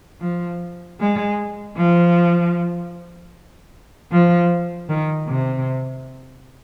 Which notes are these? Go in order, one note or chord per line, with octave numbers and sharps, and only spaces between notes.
F3
G#3
F3
F3
D#3
C3